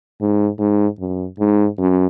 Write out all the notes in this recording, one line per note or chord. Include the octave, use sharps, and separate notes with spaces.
G#2
G#2
F#2
G#2
F#2